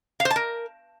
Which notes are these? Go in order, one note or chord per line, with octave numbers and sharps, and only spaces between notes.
F5
C5
A5
A#4